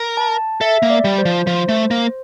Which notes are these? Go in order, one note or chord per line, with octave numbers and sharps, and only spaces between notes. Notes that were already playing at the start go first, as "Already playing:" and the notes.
Already playing: A#4
A5
A4 E5
A#3
D5
G3
C5
F3
F3 C5
A3
A#3